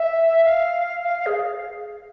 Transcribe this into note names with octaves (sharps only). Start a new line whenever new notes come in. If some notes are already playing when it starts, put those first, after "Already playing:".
Already playing: E5
F5
F5
F5
G#4